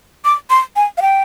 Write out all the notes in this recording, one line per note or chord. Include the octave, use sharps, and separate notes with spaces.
D6
C6
G#5
F5
G5